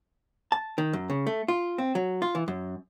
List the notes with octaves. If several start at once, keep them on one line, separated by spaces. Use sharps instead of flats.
A5
D#3
F#2
C#3
A3
F4
C4
F#3
F4
E3
F#2